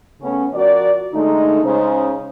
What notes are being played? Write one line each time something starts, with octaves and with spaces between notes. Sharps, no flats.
C#3 A3 B3 C#4
F3 F#4 A#4 D5
D3 G#3 A3 D#4
C#3 G#3 C#4 D#4 C5